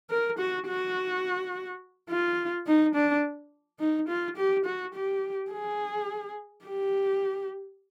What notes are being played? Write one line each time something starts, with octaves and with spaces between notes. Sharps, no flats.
A#4
F#4
F#4
F4
D#4
D4
D#4
F4
G4
F#4
G4
G#4
G4